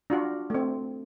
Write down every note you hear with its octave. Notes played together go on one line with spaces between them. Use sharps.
D4 F4 F#4
A3 C4